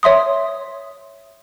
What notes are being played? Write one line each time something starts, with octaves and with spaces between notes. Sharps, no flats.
C#5 E5 C6 D#6